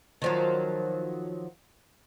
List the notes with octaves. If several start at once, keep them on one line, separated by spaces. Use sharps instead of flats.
D#3 F3 F#3